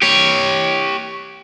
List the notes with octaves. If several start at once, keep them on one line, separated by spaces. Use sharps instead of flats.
G4 C#5